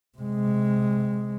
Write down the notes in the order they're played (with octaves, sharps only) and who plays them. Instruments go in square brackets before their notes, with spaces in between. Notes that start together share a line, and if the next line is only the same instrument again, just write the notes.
[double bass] C3 G#3